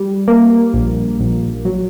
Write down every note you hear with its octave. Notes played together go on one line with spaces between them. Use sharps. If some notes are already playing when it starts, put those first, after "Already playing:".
Already playing: G3
A#3
A#1
A#1
F#3